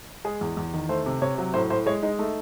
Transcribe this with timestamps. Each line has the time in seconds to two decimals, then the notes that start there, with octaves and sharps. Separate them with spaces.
0.25 G#3 G#4
0.41 E2
0.57 E2
0.74 D#3
0.89 A3 C5
1.06 C3
1.22 C3 C#5
1.38 F#3
1.54 A2 C5
1.70 A2 C5
1.86 G#3 C#5
2.02 G#3 D#4
2.19 A3 D#4